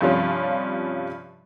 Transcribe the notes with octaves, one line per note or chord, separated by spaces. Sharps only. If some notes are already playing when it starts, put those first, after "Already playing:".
G2 C3 F3 G3 C#4 F4